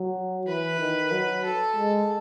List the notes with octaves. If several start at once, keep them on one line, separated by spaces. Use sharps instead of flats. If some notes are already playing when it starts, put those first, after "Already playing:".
Already playing: F#3
E3 B4
D#3
F#3
A4
G#3